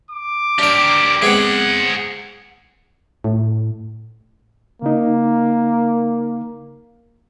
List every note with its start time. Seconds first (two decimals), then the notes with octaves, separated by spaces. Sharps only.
0.11 D6
0.59 D4 G4 A#4 D5
1.22 G#3 B3 C4 G#4 F#5
3.24 A2
4.82 C#3 A#3 D#4